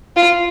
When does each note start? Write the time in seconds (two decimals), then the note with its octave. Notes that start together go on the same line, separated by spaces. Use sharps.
0.16 F4